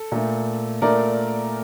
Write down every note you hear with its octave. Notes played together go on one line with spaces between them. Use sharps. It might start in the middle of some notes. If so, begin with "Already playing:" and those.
Already playing: A4
A#2 A3
A#2 A3 A#4 D5